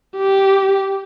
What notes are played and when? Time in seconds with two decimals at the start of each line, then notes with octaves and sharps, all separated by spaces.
0.18 G4